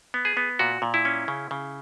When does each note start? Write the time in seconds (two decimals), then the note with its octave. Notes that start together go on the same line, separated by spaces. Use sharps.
0.14 B3
0.25 G#4
0.37 B3
0.59 A#2 F#4
0.82 A#2
0.94 E4
1.05 C#4
1.28 C#3
1.51 C#3